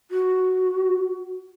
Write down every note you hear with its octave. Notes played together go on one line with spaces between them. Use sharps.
F#4